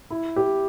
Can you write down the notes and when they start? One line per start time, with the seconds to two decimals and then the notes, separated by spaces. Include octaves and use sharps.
0.11 E4
0.36 G4